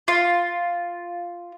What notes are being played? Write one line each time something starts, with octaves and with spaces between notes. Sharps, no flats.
F4